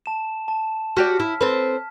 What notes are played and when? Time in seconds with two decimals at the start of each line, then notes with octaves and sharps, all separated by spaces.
0.06 A5 E7
0.48 A5
0.97 F#4 G4 D5 F6 B6
1.20 E4
1.41 C4 A4 B4